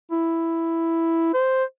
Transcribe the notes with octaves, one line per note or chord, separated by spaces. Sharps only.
E4
C5